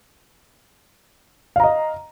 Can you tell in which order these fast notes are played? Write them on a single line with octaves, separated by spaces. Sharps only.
F5 A#5 D#5